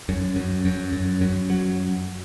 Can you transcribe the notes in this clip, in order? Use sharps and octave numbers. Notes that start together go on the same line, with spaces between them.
F#2
F#2
F#2
F#2
F#2
F#3